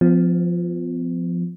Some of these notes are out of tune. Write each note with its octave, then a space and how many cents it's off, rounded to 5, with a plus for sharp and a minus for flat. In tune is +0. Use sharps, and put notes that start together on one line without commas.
F3 +0 B3 +45